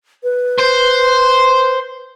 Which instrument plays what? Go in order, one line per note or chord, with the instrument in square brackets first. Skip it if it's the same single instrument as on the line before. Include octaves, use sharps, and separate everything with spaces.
[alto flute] B4
[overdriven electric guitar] C5